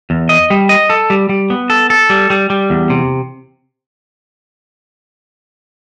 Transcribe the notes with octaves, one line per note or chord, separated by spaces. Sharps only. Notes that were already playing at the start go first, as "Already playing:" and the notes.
E2
D#5
G3
D#5
A4
G3
G3
B3
A4
A4
G3
G3
G3
E2
C3